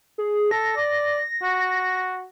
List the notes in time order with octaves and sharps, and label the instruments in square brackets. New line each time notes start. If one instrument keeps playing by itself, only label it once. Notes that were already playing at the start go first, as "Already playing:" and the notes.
[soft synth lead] G#4
[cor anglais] A4 [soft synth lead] A#6
[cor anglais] D5
F#4